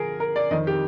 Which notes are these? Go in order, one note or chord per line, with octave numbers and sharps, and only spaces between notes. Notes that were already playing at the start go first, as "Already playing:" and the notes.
Already playing: D3 F3 G#4 A#4
A#4
D5
F2 D#3 D#5
G4